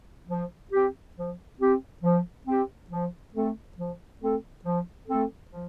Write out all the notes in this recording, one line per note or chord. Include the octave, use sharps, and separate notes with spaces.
F3
C4 G4
F3
C4 G4
F3
C4 G4
F3
A3 C4 A4
F3
A3 C4 A4
F3
A3 C4 A4
F3